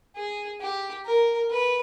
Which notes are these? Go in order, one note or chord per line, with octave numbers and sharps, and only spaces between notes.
G#4
G4
A#4
B4